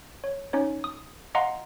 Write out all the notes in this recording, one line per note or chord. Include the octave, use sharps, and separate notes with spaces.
C#5
C#4 D#4 C#5
D#6
D#5 F5 F#5 A#5 C6